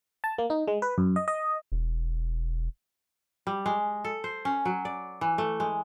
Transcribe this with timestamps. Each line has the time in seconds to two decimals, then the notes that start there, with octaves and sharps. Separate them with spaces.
0.24 A5
0.38 A#3
0.50 D#4
0.68 G#3
0.82 B4
0.98 F#2
1.16 D#5
1.28 D#5
1.72 E1
3.47 G3
3.66 G#3
4.04 A4
4.24 C5
4.45 C#4
4.65 F#3
4.85 D5
5.21 E3
5.38 A3
5.60 G#3